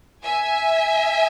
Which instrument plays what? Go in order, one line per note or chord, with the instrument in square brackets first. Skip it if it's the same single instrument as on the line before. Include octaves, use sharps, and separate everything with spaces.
[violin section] E5 G#5